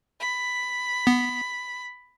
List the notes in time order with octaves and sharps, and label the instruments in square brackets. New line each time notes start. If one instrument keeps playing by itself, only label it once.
[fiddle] B5
[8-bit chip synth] B3